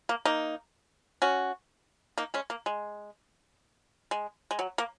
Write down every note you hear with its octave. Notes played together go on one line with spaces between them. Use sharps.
A#3
A#3 D#4
C#4 F#4
A#3 D#4
G#3 C#4
A#3
G#3
G#3
G#3
F#3
A#3